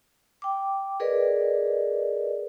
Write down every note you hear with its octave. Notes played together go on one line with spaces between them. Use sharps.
G5 D6
G#4 A#4 B4 D5 D#5